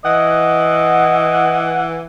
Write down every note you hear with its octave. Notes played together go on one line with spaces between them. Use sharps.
E3 D#5 F#5